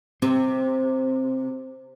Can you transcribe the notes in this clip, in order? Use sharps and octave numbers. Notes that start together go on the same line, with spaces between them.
C3 C4